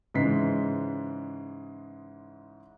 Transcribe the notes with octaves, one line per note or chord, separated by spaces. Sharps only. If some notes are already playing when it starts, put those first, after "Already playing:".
G#2 C#3 E3 G#3 B6 C7